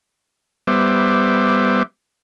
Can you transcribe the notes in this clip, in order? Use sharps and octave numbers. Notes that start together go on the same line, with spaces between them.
G3 B3 C5 E5 D6